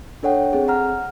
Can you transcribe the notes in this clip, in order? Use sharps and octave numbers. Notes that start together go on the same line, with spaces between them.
D4 A4 C#5 F#5 G5
C4 G#4
F#5 A#5 F6